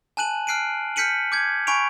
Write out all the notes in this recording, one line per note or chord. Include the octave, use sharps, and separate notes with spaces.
G#5 A5 F#6 D#7 F#7
F6 F#6 C7 D7 D#7
F6 G6 B6 C#7 D#7 F#7
D6 G6 G#6
G#5 B5 C#6 D7 F7